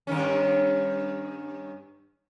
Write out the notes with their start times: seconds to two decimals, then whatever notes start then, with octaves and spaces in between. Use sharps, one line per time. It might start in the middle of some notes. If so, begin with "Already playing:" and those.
0.07 G2 D#3 C#4